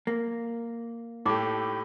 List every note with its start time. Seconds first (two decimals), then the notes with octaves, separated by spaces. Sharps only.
0.07 A#3
1.26 A2 A3 D#4 G4 D6